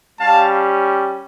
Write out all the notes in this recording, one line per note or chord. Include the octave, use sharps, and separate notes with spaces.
G3 C#4 G4 F5 A5